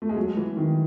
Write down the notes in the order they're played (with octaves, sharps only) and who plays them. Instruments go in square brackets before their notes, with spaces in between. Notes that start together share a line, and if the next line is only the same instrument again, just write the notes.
[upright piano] A3
G#3
F#3
E3
D#3